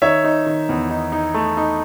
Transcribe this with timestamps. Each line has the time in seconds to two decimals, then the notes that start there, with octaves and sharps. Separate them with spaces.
0.02 D#3 C#5 E5
0.24 D#4
0.46 D#3
0.69 E2
0.90 D#4
1.12 D#4
1.34 A3
1.57 D#4